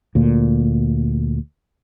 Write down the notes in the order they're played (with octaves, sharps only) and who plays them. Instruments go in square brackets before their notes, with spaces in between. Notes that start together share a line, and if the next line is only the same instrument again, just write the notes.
[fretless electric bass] D2 A#2